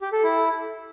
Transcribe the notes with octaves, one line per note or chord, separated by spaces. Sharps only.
G4
A4
E4